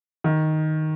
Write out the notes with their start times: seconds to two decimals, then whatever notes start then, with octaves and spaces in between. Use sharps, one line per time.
0.24 D#3